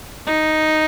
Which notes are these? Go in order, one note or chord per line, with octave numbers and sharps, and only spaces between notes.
D#4